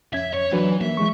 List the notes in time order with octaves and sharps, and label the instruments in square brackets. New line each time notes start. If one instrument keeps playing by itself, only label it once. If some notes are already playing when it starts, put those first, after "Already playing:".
[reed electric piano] F2 C#4 G#6 [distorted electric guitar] E5
[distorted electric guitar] C#5
[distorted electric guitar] E3 [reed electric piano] F#3 D4 B4
[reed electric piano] A#3 [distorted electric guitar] E5
[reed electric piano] E3 G#3 C#6